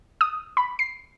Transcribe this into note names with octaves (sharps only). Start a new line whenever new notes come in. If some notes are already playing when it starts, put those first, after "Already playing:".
D#6
B5
C7